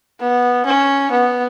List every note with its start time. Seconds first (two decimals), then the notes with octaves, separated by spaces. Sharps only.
0.20 B3
0.66 C#4
1.11 B3